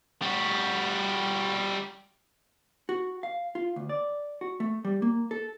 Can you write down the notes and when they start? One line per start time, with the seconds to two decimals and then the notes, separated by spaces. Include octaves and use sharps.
0.22 G3 F#4
2.89 F#4
3.23 F5
3.55 F4
3.76 D2
3.89 D5
4.41 F#4
4.60 A3
4.85 G3
5.02 A#3
5.31 A4